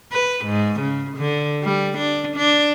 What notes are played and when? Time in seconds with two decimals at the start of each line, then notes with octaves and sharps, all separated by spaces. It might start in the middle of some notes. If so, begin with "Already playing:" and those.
0.12 B4
0.45 G#2
0.81 C#3
1.17 D3
1.63 G3
1.98 D4
2.36 D4